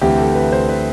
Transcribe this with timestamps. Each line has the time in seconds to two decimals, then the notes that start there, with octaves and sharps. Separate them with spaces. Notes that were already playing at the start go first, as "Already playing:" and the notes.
0.01 D2 C3 E3 G4
0.19 A4
0.35 B4
0.52 C5
0.69 B4